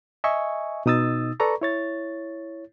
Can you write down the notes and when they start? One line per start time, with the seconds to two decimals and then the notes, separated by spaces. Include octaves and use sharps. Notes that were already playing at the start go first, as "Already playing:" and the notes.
0.24 D#5 E5 G#5 C#6
0.86 B2 D#4 D#6 E6 A6
1.40 A4 B4 D5 A#5 C#6
1.61 E4 C#5 A6